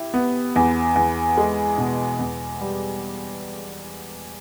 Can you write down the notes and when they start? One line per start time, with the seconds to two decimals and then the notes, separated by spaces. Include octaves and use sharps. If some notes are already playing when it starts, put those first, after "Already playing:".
Already playing: E4 G4
0.14 B3
0.56 E2
0.96 E2
1.37 G#3
1.78 B2
2.19 E2
2.61 G3